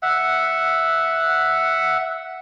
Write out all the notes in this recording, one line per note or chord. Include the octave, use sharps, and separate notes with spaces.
E5 F#5